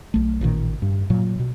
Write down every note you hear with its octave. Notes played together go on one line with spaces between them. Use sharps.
B1 A3
A1 A#2 D#3
G2
A#2 F#3
B2